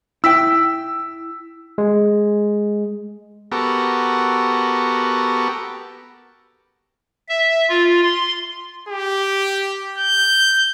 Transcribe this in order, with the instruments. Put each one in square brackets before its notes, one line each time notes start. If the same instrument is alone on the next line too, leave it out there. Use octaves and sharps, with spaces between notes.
[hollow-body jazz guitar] E4 G5 [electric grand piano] E6 B6
[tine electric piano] G#3
[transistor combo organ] B3 F#4 G4 A4 A#4
[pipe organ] E5
F4
C6
[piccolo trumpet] G4
G6